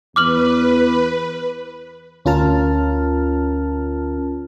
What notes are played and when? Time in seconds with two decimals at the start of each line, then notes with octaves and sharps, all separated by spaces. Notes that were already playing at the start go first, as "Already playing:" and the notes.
0.16 E2 B4 D6 F6 F#7
2.25 D2 C#4 F4 A#4 A5 F6